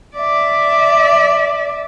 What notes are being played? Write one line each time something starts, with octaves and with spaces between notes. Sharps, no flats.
D5 E5